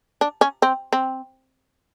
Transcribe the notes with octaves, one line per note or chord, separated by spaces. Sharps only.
D4
C#4
C4
C4